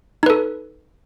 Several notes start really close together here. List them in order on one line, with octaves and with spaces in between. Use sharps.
D#4 B4 A4